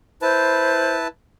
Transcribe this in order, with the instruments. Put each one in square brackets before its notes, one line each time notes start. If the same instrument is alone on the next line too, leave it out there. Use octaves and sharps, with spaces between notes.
[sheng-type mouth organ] E4 B4 A5 [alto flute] C5